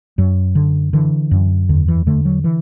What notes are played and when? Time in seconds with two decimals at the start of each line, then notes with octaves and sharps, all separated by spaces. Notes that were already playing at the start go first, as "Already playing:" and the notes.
0.18 F#2 F#3
0.55 D3
0.93 D3 E3
1.31 F#2
1.69 E2 D3
1.88 E3
2.07 D3 A3
2.25 F#3
2.44 E3